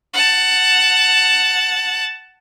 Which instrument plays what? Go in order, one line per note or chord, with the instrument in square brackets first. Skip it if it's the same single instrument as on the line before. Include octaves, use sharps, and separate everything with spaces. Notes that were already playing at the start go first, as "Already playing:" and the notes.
[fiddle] F#5 A5